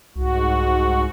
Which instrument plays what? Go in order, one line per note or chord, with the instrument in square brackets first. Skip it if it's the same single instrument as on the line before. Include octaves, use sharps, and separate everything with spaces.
[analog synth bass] C2 [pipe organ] G#2 F#4